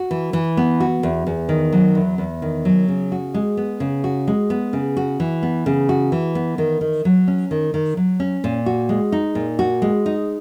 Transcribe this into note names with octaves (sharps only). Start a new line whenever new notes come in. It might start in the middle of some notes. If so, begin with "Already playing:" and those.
Already playing: F#4
E3
E3
B3
F#4
E2
E2
D#3
F#3
E2
E2
D#3
F#3
C#3
F#4
G#3
B3
C#3
F#4
G#3
B3
C#3
F#4
E3
B3
C#3
F#4
E3
B3
D#3
D#3
F#3
C#4
D#3
D#3
F#3
C#4
A#2
F#4
G#3
D#4
A#2
F#4
G#3
D#4